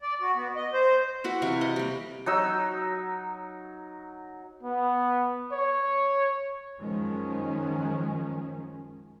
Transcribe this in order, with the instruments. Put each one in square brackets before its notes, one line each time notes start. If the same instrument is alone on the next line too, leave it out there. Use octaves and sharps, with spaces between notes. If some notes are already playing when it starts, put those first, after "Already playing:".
[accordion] D5
F#4
B3
D#5
C5
[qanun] E4 F#4 B4
C3 E3 F5 C#6
D#5
G3 A#3
[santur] F#3 D#4 E6
[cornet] B3
C#5
[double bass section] F#2 D#3 F3 G#3 C#4